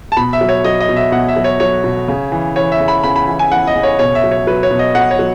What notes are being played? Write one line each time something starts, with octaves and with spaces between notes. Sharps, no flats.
A5
B2 B5
E5
F#3
C#5
F#3 D#5
D#5
B2
E5
B2 F#5
E5
F#3
C#5
F#3 C#5
B2
C#3
E3
E3 C#5
E5
C#3
B5
C#3 B5
B5
E3
G#5
E3 F#5
D#5
C#3
C#5
B2 C#5
E5
F#3
C#5
F#3 B4
C#5
B2
D#5
B2 F#5
C#5
F#3